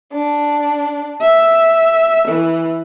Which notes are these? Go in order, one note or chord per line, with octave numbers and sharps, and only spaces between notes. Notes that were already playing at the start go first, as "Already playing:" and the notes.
D4
E5
E3